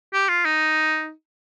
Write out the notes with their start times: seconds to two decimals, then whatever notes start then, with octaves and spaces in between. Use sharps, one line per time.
0.13 G4
0.29 F4
0.45 D#4